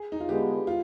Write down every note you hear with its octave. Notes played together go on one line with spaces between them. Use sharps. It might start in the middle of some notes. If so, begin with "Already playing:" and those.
Already playing: G#4
D#4
F4
D3 G#3 B3 G4
F4